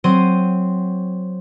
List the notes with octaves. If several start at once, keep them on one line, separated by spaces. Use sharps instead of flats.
F#3 C4 C5 D#7